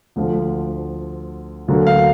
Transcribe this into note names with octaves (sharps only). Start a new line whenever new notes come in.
D2 D3 F3
D2 D3 F#3 A#3
F5